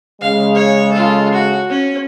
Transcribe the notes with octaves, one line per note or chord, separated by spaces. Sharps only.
C#3 G#3 F5
C#5
F4 A4
F#4
C#4